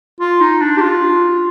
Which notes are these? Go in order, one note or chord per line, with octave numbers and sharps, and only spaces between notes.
F4
D#4
D4
G4
F4